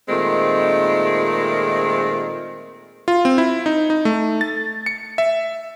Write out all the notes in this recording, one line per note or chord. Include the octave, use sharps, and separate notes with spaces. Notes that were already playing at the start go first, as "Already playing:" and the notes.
A#2 D#3 G#3 A3 C4
F4
C4
E4
D#4
D#4
A3
A6
C#7
E5